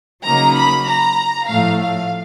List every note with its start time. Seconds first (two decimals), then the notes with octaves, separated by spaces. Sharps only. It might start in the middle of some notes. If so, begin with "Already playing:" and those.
0.24 C#3 F#3 A#3 D#4 A#5
0.55 B5
0.86 A#5
1.47 A2 F3 A3 F5
1.78 F5